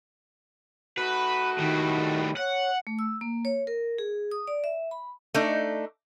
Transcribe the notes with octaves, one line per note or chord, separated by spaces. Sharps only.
A3 D#4 F#4 B4
A2 D#3 G3
C#5 F#5
A3
E6
A#3
C#5
A#4
G#4
D#6
D5
E5
B5
A3 D4 D#4